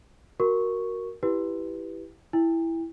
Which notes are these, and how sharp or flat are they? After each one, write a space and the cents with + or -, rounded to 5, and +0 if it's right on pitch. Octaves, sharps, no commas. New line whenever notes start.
F#4 +5 A#4 +0 C#6 +0
E4 +0 G4 -5 B4 +0
E4 +0 G5 +40